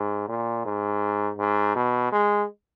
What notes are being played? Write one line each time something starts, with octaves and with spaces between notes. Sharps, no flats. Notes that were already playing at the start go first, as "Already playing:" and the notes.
Already playing: G#2
A#2
G#2
G#2
B2
G#3